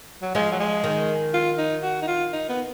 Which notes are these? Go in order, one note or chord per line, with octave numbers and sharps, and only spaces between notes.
F#3
F3 G#3
F#3
G#3
D#3
F4
D#4
F#4
D#4
F4
D#4
B3